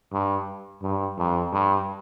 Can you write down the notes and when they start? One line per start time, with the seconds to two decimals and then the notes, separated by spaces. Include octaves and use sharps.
0.12 G2
0.83 G2
1.18 F2
1.53 G2